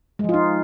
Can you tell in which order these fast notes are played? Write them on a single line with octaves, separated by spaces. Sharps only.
G#3 F3 F4 D#4